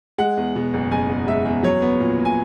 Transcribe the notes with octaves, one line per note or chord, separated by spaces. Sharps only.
G#3 F#5
E2
B2
F#1
F#1 G#5
E2
G#3 E5
E2
F#3 C#5
B3
A#2
A#2
G#5